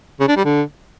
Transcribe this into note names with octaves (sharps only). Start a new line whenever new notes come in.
C#3
D4
G3
D3